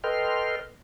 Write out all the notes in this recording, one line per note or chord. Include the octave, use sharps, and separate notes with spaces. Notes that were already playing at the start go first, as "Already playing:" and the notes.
A4 B4 D#5 G5 C6 F6